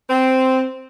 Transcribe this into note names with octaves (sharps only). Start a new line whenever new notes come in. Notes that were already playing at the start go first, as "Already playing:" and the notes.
C4